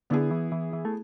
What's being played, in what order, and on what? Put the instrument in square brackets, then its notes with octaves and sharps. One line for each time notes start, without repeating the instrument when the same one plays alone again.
[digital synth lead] D3 [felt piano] B3 E4 G#4
[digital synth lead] E3
E3
E3
A3